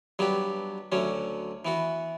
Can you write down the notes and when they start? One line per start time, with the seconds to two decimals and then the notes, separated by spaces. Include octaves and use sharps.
0.19 G2 F#3 B3 D4 G4
0.92 D2 D3 F#3 C#4
1.65 E3 B3 F#4